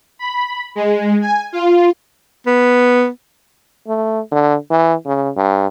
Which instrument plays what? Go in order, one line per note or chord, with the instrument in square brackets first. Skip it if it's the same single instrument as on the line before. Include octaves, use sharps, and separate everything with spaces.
[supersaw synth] B5
G#3
G#5
F4
[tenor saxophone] B3
[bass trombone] A3
D3
E3
C#3
G2